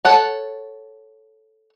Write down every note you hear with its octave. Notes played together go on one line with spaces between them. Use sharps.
A4 C#5 F#5 A5